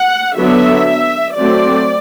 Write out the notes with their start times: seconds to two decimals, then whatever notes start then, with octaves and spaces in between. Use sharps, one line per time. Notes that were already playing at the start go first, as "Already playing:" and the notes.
Already playing: F#5
0.38 D3 F#3 B3 D4 E5
1.36 F#3 A3 C4 D5